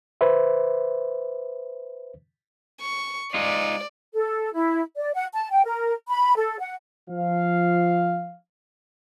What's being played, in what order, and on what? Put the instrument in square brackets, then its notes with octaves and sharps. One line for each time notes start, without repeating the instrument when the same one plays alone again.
[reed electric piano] B4 C5 E5
[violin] C#6
[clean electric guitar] G#3 D#4 F4 [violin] D5
[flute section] A4
E4
D5
F#5
A5
G5
A#4
B5
A4
F#5
[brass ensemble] F3 F5